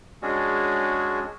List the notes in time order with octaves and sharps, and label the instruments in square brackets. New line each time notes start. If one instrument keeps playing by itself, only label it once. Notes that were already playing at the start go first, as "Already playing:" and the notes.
[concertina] G#3 C#4 D4 F#4 G#4